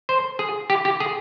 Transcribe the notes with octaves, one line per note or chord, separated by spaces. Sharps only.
C5
G#4
G4
G4
G#4